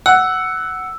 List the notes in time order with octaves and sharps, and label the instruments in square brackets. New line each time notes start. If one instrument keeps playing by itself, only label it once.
[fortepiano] F#5 [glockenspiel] E6